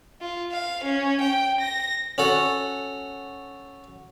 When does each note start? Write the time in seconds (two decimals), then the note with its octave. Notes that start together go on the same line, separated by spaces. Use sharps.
0.21 F4
0.51 F5
0.84 C#4
1.20 G5
1.60 A#6
2.18 C#4 F#4 A4